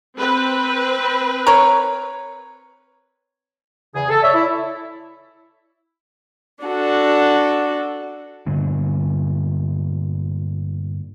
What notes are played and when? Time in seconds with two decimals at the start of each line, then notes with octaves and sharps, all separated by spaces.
0.17 C4 B4
1.47 A#4 C#5
3.95 E2 C#3 G#4
4.09 A4
4.22 C#5 D5 E5
4.35 E4
6.64 D4 F#4 A4
8.47 G2 A#2 D3